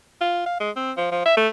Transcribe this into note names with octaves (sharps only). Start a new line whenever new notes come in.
F4
F5
G#3
C4
F3
F3
E5
A3